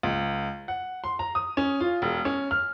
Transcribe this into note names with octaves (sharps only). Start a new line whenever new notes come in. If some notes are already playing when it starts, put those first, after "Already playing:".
C#2
F#5
C6
A#5
D#6
C#4
F4
E1
C#4
F6